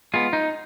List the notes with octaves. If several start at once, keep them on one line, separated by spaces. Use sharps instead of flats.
G#3 B3 F4
D#4